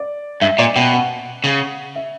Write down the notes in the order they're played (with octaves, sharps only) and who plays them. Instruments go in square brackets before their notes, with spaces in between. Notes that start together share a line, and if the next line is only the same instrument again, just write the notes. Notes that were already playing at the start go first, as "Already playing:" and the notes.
Already playing: [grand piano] D5
[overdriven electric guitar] G2 [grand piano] E5
[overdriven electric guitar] A#2 [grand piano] D5
[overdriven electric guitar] B2 [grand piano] G5
[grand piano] F#5
[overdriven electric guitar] C#3
[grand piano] E5